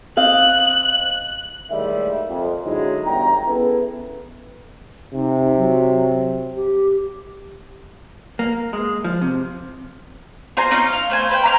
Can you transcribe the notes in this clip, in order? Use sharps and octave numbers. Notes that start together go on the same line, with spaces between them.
C4 D#5 F5 F#6
D#2 A2 G3 G#3 A#3 E5
F2
D3 F#3 G#3 C#4 D#4 E4
G1 E2 G5 A#5
B3 C#4 E4 G#4 A4 B4
C3 D#4
F#3
G4
A#3
G#3
F3
C3
F4 C5 G#5 A#5
C4 C#4 D#4 F4
F5
A3 C5 G#5
B4 C5 G5
A#5 B5 F6